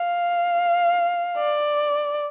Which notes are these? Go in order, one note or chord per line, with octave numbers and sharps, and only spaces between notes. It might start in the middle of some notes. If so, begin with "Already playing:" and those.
Already playing: F5
D5